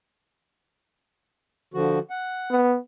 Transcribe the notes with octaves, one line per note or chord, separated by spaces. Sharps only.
D3 F3 F#4
F#5
B3